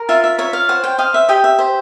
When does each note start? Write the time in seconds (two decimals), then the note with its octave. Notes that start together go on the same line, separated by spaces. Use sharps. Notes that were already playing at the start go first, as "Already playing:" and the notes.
Already playing: A#4
0.09 F4 E5
0.24 E5
0.38 C#5 E5
0.53 F5
0.69 C5 F#5
0.84 G5
0.98 D#5 F5
1.14 E5
1.29 G4 D#5
1.44 E5
1.59 C5